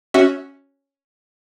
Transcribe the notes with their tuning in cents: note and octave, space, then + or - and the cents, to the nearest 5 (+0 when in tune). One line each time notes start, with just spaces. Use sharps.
C#4 +0 F#4 +0 E5 -15